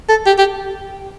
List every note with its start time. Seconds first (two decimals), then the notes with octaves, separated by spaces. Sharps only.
0.09 A4
0.27 G4
0.38 G4